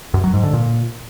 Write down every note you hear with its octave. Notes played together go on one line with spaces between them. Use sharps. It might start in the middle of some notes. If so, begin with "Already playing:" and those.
F#2
F#3
G#2
D3
A#2